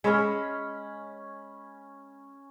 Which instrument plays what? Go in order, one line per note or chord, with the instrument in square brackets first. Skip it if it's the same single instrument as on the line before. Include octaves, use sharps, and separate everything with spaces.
[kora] G#3 C#5 E5 [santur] C#4 B5